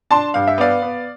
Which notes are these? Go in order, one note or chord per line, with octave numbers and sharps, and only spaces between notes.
D4 A5 C6
G2 F5
E5
B3 D5 F5
B3